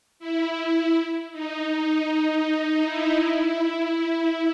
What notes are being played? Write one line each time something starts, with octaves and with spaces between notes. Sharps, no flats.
E4
D#4
D#4
D#4
E4
E4